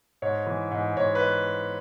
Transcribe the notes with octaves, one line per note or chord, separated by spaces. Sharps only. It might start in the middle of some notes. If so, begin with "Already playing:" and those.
G#2 C#5
E3
G#2
G#2 C#5
B4